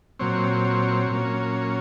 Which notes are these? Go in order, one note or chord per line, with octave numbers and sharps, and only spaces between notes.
A#2 F#3 C4 C#5
A#2 F#3 A#3 C#4